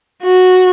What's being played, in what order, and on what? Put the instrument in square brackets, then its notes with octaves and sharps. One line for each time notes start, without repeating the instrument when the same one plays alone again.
[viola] F#4